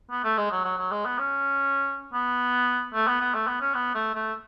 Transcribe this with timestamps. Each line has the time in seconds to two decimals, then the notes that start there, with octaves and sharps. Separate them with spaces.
0.11 B3
0.24 A3
0.38 G#3
0.51 F#3
0.64 F#3
0.78 F#3
0.91 G#3
1.06 B3
1.18 C#4
2.13 B3
2.93 A3
3.07 B3
3.21 B3
3.34 A3
3.47 B3
3.61 C#4
3.74 B3
3.94 A3
4.15 A3